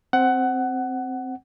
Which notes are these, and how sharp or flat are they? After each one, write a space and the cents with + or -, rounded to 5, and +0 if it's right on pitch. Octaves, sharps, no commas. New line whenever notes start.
C4 +0 F#5 +15